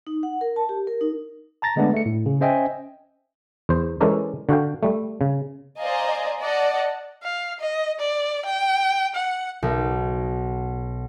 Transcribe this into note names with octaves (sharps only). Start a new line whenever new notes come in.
D#4
F#5
A#4
A5
G4
A#4
D#4
A5 A#5 A6 A#6
D3 G#3 A3 B3 D4
A3 C#7
A2
C#3
C#4 C5 D#5 E5 G5 G#5
E2 C5
E3 G#3 C#4 A4 A#4 D5
D3 F#4 F5 G5
G3 A3
C#3
C5 D5 D#5 F5 G#5 A#5
D5 D#5 F#5 A5
F5
D#5
D5
G5
F#5
B1